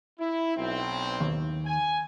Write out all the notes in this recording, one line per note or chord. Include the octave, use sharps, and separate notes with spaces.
E4
B1 C4
D#2
G#5